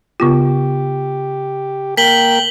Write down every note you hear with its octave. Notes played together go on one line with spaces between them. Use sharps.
C#3 B3 F4 G4
A#3 A#4 G5 B6 F#7 G7